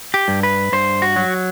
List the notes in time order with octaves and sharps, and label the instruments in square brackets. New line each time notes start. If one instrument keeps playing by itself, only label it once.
[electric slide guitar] G4
G2
B4
G2 C5
F#4
F#3